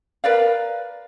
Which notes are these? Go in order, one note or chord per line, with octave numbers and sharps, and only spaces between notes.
A#4 B4 D5 F5